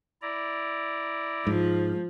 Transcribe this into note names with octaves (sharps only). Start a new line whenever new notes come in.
E4 D5 A#5
G#2 F3